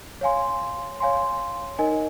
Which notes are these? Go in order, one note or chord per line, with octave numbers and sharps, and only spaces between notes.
C#5 F5 G#5 C6
C#5 F5 G#5 C6
D#4 A#4 D#5 G#5